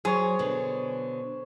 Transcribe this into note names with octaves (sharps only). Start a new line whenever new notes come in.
F#3 G#4 C5 C#5
B2 D3